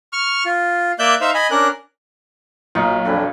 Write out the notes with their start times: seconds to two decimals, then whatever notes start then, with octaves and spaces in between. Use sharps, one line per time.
0.13 C#6 F6
0.46 F4
0.99 A#3 D5 E5 F#6 G6
1.21 D#4 C5 E5 F5
1.34 D#5 G#5 B5
1.51 C#4 D4 A#4 F#6
2.75 B1 A#2 D#4 F5 C#6
3.05 F2 C4 D4 A4 B4 G#5